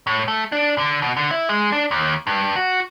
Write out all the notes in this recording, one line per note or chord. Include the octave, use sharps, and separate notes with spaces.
A2
A3
D4
D3
B2
D3
E4
G#3
D4
D#2
G2
F#4